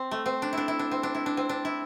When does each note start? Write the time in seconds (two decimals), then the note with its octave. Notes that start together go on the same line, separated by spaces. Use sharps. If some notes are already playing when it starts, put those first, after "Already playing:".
Already playing: C4
0.11 A3
0.26 C4
0.42 D4
0.53 D4 E4
0.68 E4
0.79 D4
0.91 C4
1.03 D4
1.15 E4
1.26 D4
1.37 C4
1.49 D4
1.65 E4